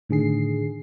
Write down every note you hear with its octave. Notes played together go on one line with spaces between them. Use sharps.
A2 D3 D#3 G#4 C7